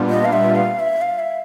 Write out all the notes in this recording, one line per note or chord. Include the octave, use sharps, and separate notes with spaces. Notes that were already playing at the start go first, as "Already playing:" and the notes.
Already playing: A#2 G3 B3 D4 F4
D#5
F5
E5
F5
E5
F5
E5